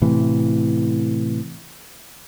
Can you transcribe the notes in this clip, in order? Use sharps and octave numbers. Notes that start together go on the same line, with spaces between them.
A2 C3 E3